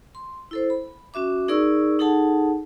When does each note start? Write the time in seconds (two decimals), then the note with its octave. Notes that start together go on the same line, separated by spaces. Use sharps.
0.15 C6
0.51 E4 A4 C5
0.70 B5
1.14 C#4 F#4 E5 D6
1.48 D#4 G#4 A#4 D5 C#6 E6
1.99 D#4 G#4 A4 F#5 A5